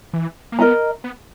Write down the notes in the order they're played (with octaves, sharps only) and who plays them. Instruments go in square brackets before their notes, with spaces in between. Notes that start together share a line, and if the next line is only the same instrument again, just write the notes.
[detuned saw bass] E3
A#3
[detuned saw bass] B3 [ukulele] A#4 D#5 A#5
[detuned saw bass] B3